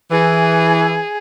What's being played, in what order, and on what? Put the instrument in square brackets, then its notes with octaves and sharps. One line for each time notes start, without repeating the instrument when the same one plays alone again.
[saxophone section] E3 [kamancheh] G#4